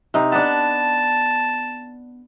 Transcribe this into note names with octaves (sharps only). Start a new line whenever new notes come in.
C3 D#4
B3 D4 A5